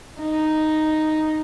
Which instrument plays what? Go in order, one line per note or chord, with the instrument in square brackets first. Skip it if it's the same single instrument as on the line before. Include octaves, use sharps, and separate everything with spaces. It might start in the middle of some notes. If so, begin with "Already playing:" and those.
[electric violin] D#4